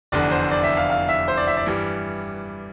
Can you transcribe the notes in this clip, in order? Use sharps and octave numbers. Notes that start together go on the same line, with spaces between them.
F1 E2 D3 D5
C5
D5
E5
F5
F5
E5
C5
D5
E5
D5
G2 E3 G3